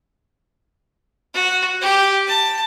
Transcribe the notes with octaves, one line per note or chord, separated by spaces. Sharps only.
F#4
G4
A5